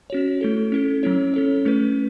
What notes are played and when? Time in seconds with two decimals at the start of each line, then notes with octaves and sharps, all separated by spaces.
0.10 C#4 F#4 C#5
0.41 A3 E4 A4
0.72 C#4 E4 A4
1.03 F#3 C#4 E4 C#5
1.34 C#4 A4 C#5
1.65 A3 C#4 E4 B4